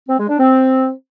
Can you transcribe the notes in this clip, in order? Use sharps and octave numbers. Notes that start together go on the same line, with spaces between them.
C4
G#3
D4
C4